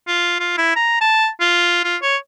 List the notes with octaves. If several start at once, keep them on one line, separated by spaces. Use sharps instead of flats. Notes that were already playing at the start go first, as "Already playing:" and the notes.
F4
F4
E4
A#5
A5
F4
F4
C#5